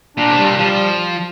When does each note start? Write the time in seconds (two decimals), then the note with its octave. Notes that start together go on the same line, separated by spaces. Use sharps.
0.17 A#2 D4
0.30 C3
0.38 A#2 G3
0.58 F3 G3